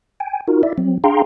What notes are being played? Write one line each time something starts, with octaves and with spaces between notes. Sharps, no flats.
G5 G#5
D#4 F4 F#4 A#4
E4 D5 E5
F#3 C4
D4 G#4 F5 G5 A#5 C6